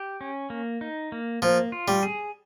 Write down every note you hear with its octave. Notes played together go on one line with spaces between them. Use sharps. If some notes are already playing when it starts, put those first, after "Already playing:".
Already playing: G4
C#4
A#3
D#4
A#3
F3 A#3
F4
G3
G#4